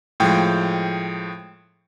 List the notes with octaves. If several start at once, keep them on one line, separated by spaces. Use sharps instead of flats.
A2 F3 G#3 G5